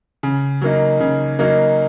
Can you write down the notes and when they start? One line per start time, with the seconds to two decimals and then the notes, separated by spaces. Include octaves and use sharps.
0.23 C#3
0.61 F#3 A#3 D#4
1.00 C#3
1.39 F#3 A#3 D#4